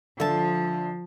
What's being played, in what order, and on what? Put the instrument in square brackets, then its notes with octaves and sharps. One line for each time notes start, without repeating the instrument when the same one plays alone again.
[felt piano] D3 [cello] F3 [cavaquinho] E5 A5